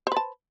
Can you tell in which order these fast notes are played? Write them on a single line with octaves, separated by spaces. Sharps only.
C5 B4 A5